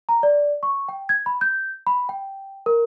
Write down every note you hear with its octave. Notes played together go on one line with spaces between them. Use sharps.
A#5
D5
C#6
G5
G#6
B5
G6
B5
G5
A#4